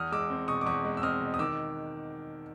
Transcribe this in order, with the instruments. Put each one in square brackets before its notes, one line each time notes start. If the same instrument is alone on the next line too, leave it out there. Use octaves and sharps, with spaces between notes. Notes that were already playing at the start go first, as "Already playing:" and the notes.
Already playing: [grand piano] E2 D#6 F6
G#3 D6 E6
C4
B2 C#6 D#6
D6
E2 C#6 D#6
G#3
E6
C4 D#6 F6
B2
D#6
D#3 D6 E6